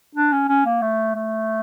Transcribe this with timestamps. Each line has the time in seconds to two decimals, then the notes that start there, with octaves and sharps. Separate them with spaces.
0.15 D4
0.32 C#4
0.49 C#4
0.66 A#3
0.82 A3
1.15 A3